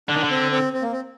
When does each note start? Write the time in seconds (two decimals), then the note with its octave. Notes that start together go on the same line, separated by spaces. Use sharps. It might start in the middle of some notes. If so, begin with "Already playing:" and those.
0.09 D3 D4
0.17 D#3
0.24 D3
0.30 C4
0.51 C4
0.73 C4
0.82 A#3
0.92 C4